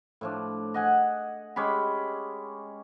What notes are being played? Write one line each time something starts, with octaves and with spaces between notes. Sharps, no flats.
A2 F3 D4
D#5 F#5 G#5
G#3 C#4 G4 B5